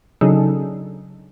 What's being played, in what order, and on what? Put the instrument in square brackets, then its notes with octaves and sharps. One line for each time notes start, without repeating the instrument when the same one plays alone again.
[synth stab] C#3 F#3 D4 D#4 G#4 A4